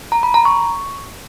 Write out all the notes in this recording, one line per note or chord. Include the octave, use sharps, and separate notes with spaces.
A#5
B5
A#5
C#6